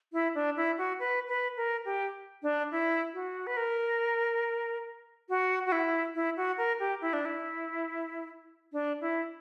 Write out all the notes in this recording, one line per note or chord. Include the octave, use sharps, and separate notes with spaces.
E4
D4
E4
F#4
B4
B4
A#4
G4
D4
E4
F#4
B4
A#4
F#4
F#4
E4
E4
F#4
A#4
G4
E4
D4
E4
D4
E4